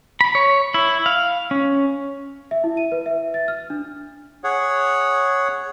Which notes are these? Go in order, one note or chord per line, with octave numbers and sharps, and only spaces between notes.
B5
C#5
E4
F5
C#4
E5
E4
D#7
B4
E5
A6
F6
D4
G#4 C#5 F#5